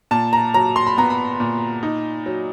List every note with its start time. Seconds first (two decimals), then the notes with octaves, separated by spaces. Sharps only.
0.11 A#2 A5
0.33 A#5
0.54 F#3 A#5
0.76 C6
0.87 B5
0.98 B3 A#5
1.10 B5
1.40 A#2
1.83 D#4
2.26 F#3